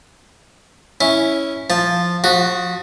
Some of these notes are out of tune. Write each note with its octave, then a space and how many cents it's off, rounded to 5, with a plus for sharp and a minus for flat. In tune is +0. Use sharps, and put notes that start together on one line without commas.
C#4 +0 E4 -10
F3 +0 A5 +0
F3 +30 F#4 +0